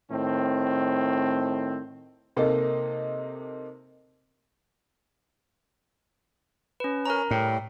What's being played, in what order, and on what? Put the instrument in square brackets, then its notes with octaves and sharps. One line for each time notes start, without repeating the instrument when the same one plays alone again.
[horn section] A2 D#3 C4
[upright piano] C3 A#3 D#4 A4
[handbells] C#4 B4
[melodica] C#4 [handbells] A#4 A#5
[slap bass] A2 [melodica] G3